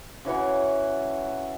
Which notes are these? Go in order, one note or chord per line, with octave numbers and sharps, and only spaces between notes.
C#3 E3 F#4 C#5